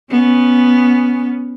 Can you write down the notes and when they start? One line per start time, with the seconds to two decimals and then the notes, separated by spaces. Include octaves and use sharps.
0.11 B3 C#4